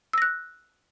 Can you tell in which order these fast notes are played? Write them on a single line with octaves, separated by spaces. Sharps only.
E6 A#6 F#6